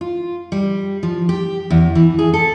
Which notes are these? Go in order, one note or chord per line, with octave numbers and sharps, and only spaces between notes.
F4
G3
F3
G4
E2
E3
G#4
A4